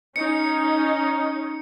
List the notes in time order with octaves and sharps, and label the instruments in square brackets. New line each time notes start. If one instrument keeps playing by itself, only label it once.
[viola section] C#4 D#4 [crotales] C#7